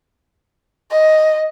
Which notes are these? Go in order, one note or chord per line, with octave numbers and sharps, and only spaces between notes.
D#5